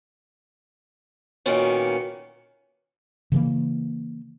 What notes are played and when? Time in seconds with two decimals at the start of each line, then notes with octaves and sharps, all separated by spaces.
1.46 A#2 D#3 A#3 B3 C#4 F#4
3.32 C#3 E3 A#3